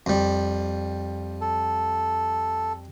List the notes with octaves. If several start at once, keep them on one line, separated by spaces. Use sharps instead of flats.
F2 G3
A4